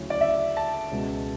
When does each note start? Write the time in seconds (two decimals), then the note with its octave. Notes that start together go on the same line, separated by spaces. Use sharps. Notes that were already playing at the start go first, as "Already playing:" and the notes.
Already playing: D2 C#3 F#3 C#4 E4
0.10 D5
0.21 E5
0.57 A5
0.91 C#2 B2 G#3